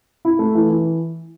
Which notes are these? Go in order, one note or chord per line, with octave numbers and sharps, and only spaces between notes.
E4
A3
E3
E3